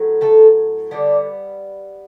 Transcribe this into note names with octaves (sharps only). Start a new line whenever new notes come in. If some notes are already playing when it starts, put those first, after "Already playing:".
Already playing: A2 F#3
A3 A4
D3 G3 B3 D4 D5